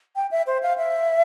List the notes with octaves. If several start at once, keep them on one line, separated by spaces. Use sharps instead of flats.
G5
E5
C5
F5
E5